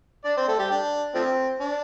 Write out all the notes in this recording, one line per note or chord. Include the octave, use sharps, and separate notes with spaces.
D4 D5
C4 C5
A3 A4
G3 G4
D4
F3 A3 C4
D4